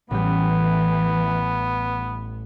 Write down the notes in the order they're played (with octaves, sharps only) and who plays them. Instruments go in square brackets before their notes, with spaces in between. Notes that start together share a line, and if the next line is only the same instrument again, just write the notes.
[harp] A1 G3 G5 [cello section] E3 [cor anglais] B3